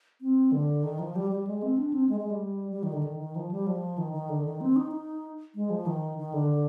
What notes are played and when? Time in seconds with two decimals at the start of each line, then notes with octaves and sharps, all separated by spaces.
0.21 C4
0.52 D3
0.84 D#3
0.99 F3
1.16 G3
1.31 G3
1.47 G#3
1.63 C4
1.78 D4
1.94 C4
2.09 G#3
2.20 G#3
2.30 G3
2.72 G3
2.83 D#3
2.93 D3
3.03 D#3
3.20 D#3
3.36 F3
3.51 G3
3.67 F3
3.98 D#3
4.13 D#3
4.29 D3
4.45 D#3
4.61 C4
4.76 D#4
4.92 D#4
5.55 G#3
5.70 F3
5.86 D#3
6.18 D#3
6.34 D3